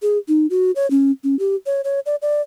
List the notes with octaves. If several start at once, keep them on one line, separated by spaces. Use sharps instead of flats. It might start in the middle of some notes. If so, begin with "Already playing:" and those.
G#4
D#4
F#4
C#5
C#4
C#4
G4
C#5
C#5
D5
D5